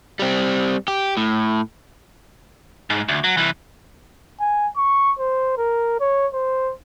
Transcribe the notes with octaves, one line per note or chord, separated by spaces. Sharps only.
G3 C4
G4
A2
G#2
D2
F#3
C2 E3
G#5
C#6
C5
A#4
C#5
C5